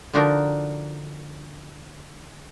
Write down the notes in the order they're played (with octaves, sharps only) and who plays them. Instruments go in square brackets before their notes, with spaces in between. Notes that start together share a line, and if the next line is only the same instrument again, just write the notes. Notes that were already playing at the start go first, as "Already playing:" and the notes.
[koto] D3 F3 D4 D#4 F#4 A#4